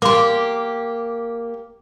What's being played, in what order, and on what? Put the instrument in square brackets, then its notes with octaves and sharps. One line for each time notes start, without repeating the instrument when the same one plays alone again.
[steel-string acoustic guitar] A#3 G4 [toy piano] C6 D6